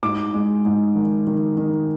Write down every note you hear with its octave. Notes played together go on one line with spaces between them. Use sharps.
G#2 D6
G#3
G#2
D#3
D#3
D#3